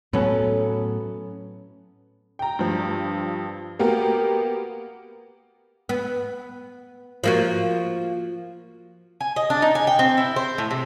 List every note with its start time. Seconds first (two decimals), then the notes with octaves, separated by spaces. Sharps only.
0.13 A2 F#3 B3 C#4 A4 B4
2.39 G5 A#5
2.59 G2 F3
3.79 A#3 B3 F#4 G4 A#4
5.89 B3
7.24 F3 A#3 F#4
9.21 G#5
9.36 D#5
9.50 D4
9.62 D#4
9.75 G#5
9.87 G5
9.99 C4
10.17 E4
10.36 C5
10.58 A2
10.71 C3